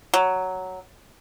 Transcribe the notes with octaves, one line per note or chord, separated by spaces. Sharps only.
F#3